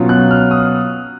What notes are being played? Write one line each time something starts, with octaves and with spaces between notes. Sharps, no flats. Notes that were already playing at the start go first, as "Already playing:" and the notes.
Already playing: B2 F#3 C#4 F4
F#6
F6
D#6